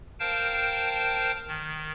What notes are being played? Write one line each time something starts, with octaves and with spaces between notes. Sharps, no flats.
A#4 C5 F5 G5 A5
D#3